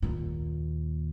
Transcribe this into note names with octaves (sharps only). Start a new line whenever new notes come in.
D#2 A#2